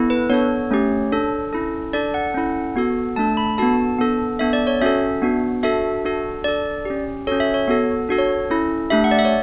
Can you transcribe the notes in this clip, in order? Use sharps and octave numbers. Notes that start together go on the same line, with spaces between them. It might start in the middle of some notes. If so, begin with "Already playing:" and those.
Already playing: B3 E4 A4
B4
B3 D4 A4 C#5
A3 C#4 G4
D4 A4
C#4 E4 A4
D4 A4 D5
F#5
C#4 E4 A4
B3 F#4 A4
A3 D4 A4 A5
B5
B3 D4 F#4 A4 A5
B3 D4 A4
B3 D4 A4 E5
D5
C#5
C#4 F#4 A4 E5
B3 D4 F#4
D4 F#4 A4 E5
D4 F#4 A4
D4 A4 D5
C#4 G4
C#4 F#4 A4 C#5
E5
C#5
B3 F#4 A4
D4 F#4 A4
C#5
C#4 E4 A4
A3 D4 G4 E5
F#5
D5
E5
C#5